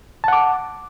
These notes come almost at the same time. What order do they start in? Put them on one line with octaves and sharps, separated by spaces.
A5 F#5 D6